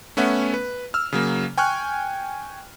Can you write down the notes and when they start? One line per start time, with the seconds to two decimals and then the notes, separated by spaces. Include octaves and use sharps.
0.17 A3 B3 C#4 E5 F#5
0.54 B4
0.94 E6 F6
1.13 C#3 F#3 A#3
1.58 G5 G#5 C#6 F6 F#6